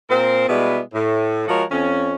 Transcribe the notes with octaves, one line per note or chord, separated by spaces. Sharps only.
A#2 C4 A#4 C5
B2 G3 G#3 B3 E4
A2
F3 G#3 F#4 A#4 C#5
F2 C#4